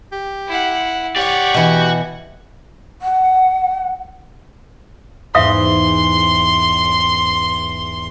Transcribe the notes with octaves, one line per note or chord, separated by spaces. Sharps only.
G4
E4 F#5
G4 C#5 D5 F#5
B2 E3 F#4
F#5
E2 G#2 E5 F5 C6 D#6